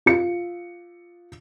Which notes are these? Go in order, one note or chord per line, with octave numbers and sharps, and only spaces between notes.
F4 C#7